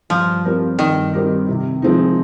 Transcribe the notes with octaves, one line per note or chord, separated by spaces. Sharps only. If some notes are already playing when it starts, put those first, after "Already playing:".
G2 F3
G3 C4 G4 A#4
G2 D#3
G3 C4 G4 A#4
C3
F3 G#3 C4 D#4